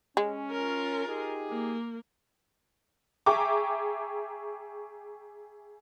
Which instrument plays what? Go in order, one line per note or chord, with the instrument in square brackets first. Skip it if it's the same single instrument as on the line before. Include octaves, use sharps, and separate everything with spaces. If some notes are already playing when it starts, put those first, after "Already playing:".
[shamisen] G#3 [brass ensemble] C#4
[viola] F4 A#4
[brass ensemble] D#4 G4 G#4
[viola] A#3
[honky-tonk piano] G#4 E5 G5 A#5 C#6 D6